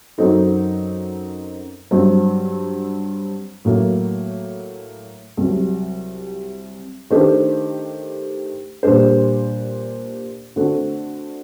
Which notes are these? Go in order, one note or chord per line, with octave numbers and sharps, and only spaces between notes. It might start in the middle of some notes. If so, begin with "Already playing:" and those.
F#2 F#3 C4 D#4 A4
G2 F#3 C4
A2 F#3 A#3
C2 C3 F#3
D#3 A3 D4 G4 C5
A#2 G3 D4 G4 C5
D3 A3 C4 F#4